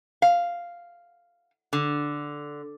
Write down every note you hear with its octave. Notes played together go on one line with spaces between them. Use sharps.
F5
D3